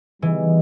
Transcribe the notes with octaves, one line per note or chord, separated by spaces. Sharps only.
E3 G3 B3 D#4 G#4 D#5